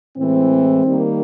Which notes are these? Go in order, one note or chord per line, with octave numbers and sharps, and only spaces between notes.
A2 E3 G#3 C4
D#3 G3 A#3